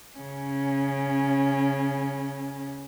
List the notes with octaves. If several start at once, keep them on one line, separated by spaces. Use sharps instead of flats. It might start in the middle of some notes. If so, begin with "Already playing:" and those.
C#3 C#4